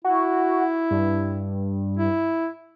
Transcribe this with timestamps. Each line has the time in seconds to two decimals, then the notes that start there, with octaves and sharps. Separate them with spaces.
0.05 E4 F#4
0.91 G2
1.98 E4